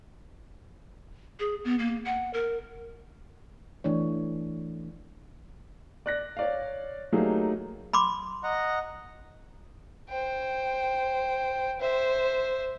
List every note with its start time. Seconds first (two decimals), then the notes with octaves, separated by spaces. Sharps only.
1.40 G#4
1.65 B3
1.79 A#3
2.05 F#5
2.34 A#4
3.84 E3 A3 D4 C#5
6.06 D5 F#6 A#6
6.37 C#5 D5 F5
7.12 F#3 A3 A#3 D#4 G4 G#4
7.93 B5 C6 D6
8.44 D#5 F#5 A#5
10.10 C5 G5
11.80 C5 E5